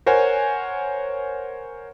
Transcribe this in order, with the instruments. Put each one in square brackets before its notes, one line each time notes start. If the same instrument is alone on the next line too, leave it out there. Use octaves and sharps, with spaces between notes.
[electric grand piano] A#4 C5 C#5 F#5 G#5